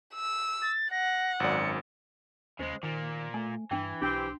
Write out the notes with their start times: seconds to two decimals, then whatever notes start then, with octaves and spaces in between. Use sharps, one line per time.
0.14 E6
0.62 A6
0.92 F#5 A#6
1.40 G#1 F#2 D5 C#7
2.59 D#2 C#3 G#3 C5
2.83 A#2 D#3 A#3
3.34 A3 G#5
3.71 G2 E3 D4 G5
4.02 B1 C4 D4 G4